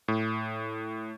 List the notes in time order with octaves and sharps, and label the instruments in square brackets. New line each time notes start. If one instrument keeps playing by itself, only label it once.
[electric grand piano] A2